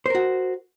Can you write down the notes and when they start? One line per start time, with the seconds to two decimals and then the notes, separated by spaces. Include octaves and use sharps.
0.06 C5
0.10 A#4
0.15 F#4